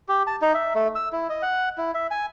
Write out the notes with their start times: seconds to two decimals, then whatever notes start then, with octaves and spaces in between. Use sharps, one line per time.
0.08 G4
0.27 A5
0.42 D#4
0.54 E5
0.75 A3
0.95 E6
1.12 E4
1.29 D#5
1.42 F#5
1.78 E4
1.94 E5
2.11 G#5